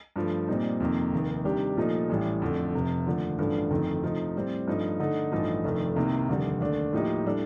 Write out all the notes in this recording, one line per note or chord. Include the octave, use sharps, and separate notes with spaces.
G2 F3 A3
A#2 G3 C4 D#4
F2 C3 D#3 A#3
F1 D#2 D#3
C3 D#3 G3 D4 G4
A#2 F3 A3 D#4
A1 A2 G3
F2 D3 A3
F1 F2 C3
D#2 D3 F3 A3
A1 G2 D3 F3 A3
G1 F2 D#3 A3
C3 F3 A3 D#4
A2 G3 C4
G2 F3 A3 D#4
D3 A3 D#4
A1 G2 F3 A3 D#4
F1 F2 D#3 A3 D4
C2 C3 D#3 A#3
F1 D#2 D3 G3
D#2 D3 A3 D4
A2 F3 A#3 D#4 G4
A2 G3 D4 A4